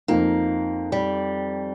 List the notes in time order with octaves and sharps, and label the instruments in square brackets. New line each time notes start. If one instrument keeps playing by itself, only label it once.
[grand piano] F2 F3 D#4 [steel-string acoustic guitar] A#3
[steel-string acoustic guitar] G3